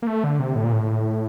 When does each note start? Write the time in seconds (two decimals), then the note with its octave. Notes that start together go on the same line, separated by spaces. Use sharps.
0.02 A#3
0.07 A3
0.24 D3
0.39 C3
0.56 A2
0.64 A#2
0.73 A2